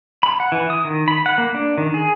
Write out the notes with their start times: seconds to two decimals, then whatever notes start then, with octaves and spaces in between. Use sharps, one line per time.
0.23 B5
0.40 F#5
0.52 E3
0.70 D#6
0.85 D#3
1.08 B5
1.26 F#5
1.38 A#3
1.54 D4
1.78 D#3
1.94 G#4